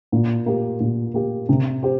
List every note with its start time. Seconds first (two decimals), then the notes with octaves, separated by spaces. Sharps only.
0.12 A#2
0.46 A#3 G4
0.80 A#2
1.14 A#3 G4
1.49 C3
1.83 G4 C5